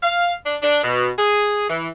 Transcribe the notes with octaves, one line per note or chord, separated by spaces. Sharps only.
F5
D4
D4
B2
G#4
E3